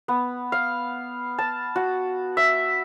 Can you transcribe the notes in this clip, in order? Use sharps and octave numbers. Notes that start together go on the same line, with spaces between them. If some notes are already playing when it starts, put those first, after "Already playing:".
B3
F5
A5
F#4
E5